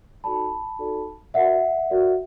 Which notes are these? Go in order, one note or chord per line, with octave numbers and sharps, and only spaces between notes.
D#4 F#4 A4 D5 A5 B5
D#4 F#4 A4 D5
F#4 A#4 D5 E5 F#5
F#4 A#4 D5